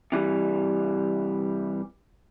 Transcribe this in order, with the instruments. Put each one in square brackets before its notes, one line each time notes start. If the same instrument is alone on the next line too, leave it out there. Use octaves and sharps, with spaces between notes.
[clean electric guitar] C3 E3 G3